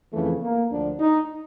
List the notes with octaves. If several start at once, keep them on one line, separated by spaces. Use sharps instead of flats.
F2 C#3 E3 A3
A#3
D2 D3 F3 D4
D#4